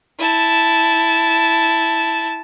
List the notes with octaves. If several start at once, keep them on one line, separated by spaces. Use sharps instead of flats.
E4 A5